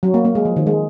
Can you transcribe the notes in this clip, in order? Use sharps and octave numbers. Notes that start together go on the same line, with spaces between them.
F#3
A#3
A#3
G#3
F3
D#3
G#3